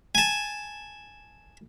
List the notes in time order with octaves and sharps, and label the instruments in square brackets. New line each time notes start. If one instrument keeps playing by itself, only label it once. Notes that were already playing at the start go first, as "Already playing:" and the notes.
[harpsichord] G#5 A5